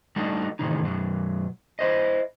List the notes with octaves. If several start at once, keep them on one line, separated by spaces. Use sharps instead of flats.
G3 A3 D4 D#4 F#4
A2 C3 D#3 E3 D#4
B1 F#2 F#3
E4 C5 D#5